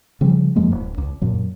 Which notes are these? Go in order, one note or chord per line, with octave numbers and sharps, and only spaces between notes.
C#3 F3 G3
F#2 F3 G#3 A#3
D1
C#2
F#2 A#2 F#3